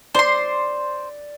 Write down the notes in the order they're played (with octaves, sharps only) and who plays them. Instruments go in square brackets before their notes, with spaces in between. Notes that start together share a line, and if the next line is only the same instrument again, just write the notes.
[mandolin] C5 C6 [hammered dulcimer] D5